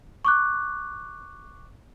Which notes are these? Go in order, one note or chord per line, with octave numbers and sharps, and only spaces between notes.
C#6 D6 F#6